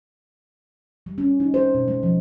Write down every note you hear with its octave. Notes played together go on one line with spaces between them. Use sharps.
G3
C#4
D#4
C5
B2
G#3
F3